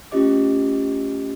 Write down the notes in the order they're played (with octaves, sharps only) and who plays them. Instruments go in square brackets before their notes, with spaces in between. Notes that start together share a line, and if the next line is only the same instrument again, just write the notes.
[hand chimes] A3 C#4 F4 G4 D#5 D6